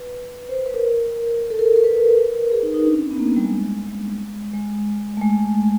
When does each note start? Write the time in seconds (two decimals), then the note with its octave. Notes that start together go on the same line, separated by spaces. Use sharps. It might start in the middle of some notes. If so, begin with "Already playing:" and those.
Already playing: B4
0.49 C5
0.66 B4
0.74 A#4
1.50 A4
1.59 A#4
1.76 A#4
1.84 B4
2.09 B4
2.18 A#4
2.52 G#4
2.63 D#4
2.74 D#4
2.85 D4
2.94 C#4
3.02 C4
3.11 B3
3.19 A#3
3.27 B3
3.36 G3
3.45 G#3
3.87 G#3
4.54 G#3
5.17 A3
5.21 G#3